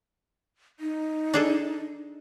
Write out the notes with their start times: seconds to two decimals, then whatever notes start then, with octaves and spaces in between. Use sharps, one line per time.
0.80 D#4
1.34 D4 G#4 A4